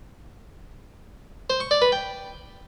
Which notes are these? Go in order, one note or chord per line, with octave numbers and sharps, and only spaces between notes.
C5
C#6
D5
B4
G5